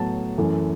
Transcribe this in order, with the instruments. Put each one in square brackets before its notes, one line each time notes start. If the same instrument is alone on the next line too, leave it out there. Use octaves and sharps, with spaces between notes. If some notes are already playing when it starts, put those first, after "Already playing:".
Already playing: [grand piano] A2 F#3 B3 A5
F#2 E3 A3